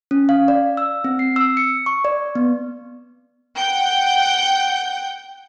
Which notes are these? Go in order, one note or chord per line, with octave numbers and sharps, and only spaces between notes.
C#4
F5
D5
E6
C4
C7
E6
C#7
C#6
D5
B3
F#5 G5 G6